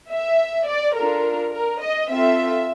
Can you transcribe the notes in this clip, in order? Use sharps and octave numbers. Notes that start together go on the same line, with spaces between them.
E5
D5
D4 F4 A4 A#4
A#4
D#5
C4 F4 A4 E5